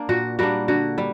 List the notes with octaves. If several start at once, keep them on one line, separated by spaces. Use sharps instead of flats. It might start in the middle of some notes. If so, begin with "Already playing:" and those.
Already playing: A#3 D4
A#2 F#4
G3 A#3 D4 F#4
D3 F#4
G3